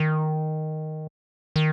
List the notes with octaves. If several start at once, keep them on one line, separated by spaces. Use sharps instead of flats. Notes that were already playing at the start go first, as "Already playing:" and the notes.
Already playing: D#3
D#3